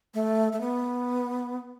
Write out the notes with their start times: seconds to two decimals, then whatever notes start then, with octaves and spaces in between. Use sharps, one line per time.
0.14 A3
0.53 A3
0.61 B3